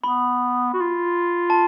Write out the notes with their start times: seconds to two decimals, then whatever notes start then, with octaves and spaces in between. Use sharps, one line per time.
0.03 B3 B5
0.74 F#4
0.81 F4
1.50 A5